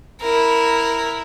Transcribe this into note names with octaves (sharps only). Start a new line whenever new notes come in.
E4 A#4